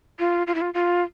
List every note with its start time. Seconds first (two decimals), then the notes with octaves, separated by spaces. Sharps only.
0.19 F4
0.47 F4
0.55 E4
0.61 F4
0.74 F4